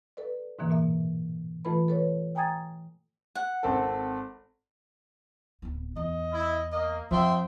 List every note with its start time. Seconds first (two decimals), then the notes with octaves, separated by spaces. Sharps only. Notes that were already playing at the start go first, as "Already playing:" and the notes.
0.17 A4 B4 D5
0.59 G#2 B2 D3 E3 A#3
0.70 A#2 A#3 E5
1.65 E3 A3 F4 A4 B4 B5
1.88 A4 B4 C#5
2.35 G5 G#5 A#5 D#6 G#6 A6
3.35 F#5
3.63 G#1 C4 A4
5.62 D1 B3
5.96 E2 D#5
6.33 E4
6.72 A#3 D#5
7.11 F2 F3 E5 G5 C6